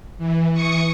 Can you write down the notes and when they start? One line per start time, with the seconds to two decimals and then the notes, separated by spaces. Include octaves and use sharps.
0.18 E3
0.52 E3 C#6 D#6 C#7